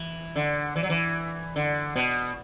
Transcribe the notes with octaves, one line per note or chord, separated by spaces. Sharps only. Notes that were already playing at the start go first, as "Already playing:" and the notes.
Already playing: E3
D3
E3
F#3
E3
D3
B2